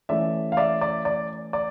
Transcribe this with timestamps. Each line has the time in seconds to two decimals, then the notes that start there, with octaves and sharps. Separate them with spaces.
0.09 E3 A3 C#4 D5 E5
0.52 F5
0.57 D5 E5
0.81 D5
1.05 D5
1.53 D5